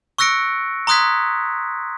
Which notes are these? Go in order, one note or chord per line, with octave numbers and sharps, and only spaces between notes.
C#6 E6 F#6 A#6 C#7 D7
A#5 C6 D#6 F#6 G#6 B6